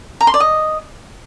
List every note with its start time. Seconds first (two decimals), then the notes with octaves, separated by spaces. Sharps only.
0.21 A#5
0.27 C6
0.34 D5
0.40 D#5